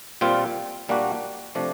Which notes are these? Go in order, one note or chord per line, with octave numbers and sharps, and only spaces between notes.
A#2 G3 C4 F4
A#2 G3 A#3 D4 F#4
C3 F3 A3 D4